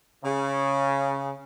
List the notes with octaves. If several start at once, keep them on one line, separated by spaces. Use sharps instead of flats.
C#3